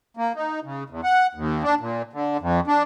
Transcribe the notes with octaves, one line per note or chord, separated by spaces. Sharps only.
A#3
D#4
C#3
E2
F#5
D#2
D4
A#2
D3
F2
D4